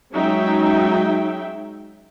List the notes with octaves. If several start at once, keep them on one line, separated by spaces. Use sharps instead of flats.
F#3 G#3 C#4 D#4 E5 G5